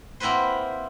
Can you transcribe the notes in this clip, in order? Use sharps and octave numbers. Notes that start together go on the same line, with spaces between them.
A#3 C4 E4 F#4 B4 C5